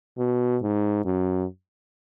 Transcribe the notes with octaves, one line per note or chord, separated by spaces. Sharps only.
B2
G#2
F#2